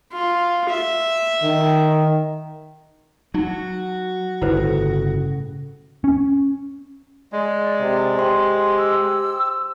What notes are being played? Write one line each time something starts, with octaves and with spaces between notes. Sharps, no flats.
F4
E5
D#3
F#3 D#4 F#4
G1 A2 C#3 A3 E4 B4 C5
C#4
G#3 D5
C3
G4 C5 C6
E6